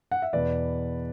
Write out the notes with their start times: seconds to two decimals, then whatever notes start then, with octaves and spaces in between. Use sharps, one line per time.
0.11 F#5
0.22 E5
0.33 E2 B2 B4 D5